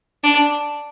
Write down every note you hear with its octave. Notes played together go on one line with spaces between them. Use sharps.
D4